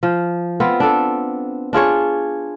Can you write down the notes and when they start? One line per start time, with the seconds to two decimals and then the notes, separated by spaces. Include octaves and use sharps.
0.03 F3
0.60 B3 C4 F4
0.80 D4 A4
1.73 D4 F4 G#4 C#5